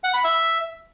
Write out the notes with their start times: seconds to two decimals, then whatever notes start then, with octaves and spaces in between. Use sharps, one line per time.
0.04 F#5
0.14 B5
0.24 E5